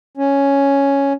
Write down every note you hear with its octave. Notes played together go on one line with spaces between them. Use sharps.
C#4